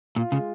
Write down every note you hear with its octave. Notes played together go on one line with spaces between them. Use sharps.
A#2 F4
C#3 G#3